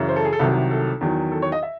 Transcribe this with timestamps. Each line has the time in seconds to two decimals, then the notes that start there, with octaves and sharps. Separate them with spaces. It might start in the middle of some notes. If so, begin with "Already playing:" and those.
Already playing: F#2 C#3 E3
0.09 C5
0.16 A4
0.25 G#4
0.33 A4
0.39 C2 C3 D#3 F#3
0.71 A4
1.01 E2 D#3 F#3
1.32 A4
1.42 C#5
1.52 D#5
1.63 E5